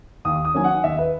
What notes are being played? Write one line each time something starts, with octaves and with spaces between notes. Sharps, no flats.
D#2 D#6
D#6
D#3 F#3 A#3 C#4 G#5
F#5
D#2 E5
B4